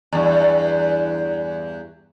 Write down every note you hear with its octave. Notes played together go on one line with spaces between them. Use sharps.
E2 G2